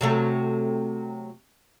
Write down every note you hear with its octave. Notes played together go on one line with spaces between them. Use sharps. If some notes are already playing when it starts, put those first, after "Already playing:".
C3 F#3 A3